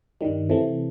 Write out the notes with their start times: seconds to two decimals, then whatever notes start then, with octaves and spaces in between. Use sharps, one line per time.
0.21 G2 D#3 G3
0.49 C3 E3 A3